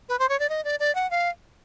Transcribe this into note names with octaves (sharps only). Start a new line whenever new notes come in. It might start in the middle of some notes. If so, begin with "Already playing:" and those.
B4
C5
C#5
D5
D#5
D5
D5
F#5
F5